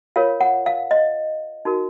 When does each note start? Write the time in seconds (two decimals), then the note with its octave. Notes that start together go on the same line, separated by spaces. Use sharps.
0.16 F4 A#4 C#5 F5
0.41 F#5
0.66 F5
0.91 D#5
1.65 D#4 F#4 A#4